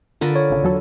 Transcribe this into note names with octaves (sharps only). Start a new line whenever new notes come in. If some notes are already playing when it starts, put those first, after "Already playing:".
D3 F4 A#4 B4
C#5
A1 C#3
E2 F#3 A4